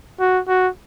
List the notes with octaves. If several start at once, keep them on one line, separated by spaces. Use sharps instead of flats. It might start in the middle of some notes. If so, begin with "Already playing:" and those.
F#4
F#4